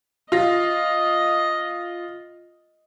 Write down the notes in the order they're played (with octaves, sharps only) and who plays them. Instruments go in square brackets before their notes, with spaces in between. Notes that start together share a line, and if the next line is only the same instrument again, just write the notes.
[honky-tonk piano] F4 A#6 [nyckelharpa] D#5